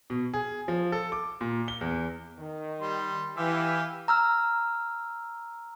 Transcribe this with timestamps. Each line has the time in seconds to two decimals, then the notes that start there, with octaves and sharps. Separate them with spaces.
0.10 B2
0.34 G#4
0.68 F3
0.92 A4
1.12 D6
1.41 A#2
1.68 G7
1.81 E2
2.37 D#3
2.81 G3 C6
3.37 E3 G4 E5 F5
4.08 A#5 E6 F6